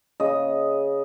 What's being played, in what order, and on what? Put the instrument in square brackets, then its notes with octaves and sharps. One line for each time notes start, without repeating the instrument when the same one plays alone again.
[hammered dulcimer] C#3 D#5